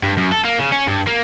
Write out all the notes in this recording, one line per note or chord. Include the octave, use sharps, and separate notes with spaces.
G2
F#2
A4
A#3
C#3
C#4
G2
A#3